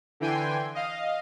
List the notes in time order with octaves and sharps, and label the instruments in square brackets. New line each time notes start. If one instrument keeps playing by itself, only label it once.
[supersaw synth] D3 E3 G5 G#5 C6
D#5 F5